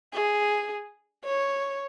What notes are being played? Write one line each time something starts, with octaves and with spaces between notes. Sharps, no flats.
G#4
C#5